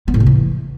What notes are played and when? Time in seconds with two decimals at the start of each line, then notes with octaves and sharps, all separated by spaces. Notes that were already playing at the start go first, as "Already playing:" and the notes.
0.08 B3
0.14 A2
0.20 C3
0.26 E3